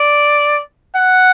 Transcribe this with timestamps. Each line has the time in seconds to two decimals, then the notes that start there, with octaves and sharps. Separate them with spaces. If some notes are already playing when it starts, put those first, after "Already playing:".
Already playing: D5
0.97 F#5